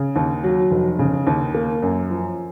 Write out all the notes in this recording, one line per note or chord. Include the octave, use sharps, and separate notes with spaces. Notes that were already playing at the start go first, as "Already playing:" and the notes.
Already playing: C#3
D#2
F#3
F1
C#3
D#2
A#3
F#2
F3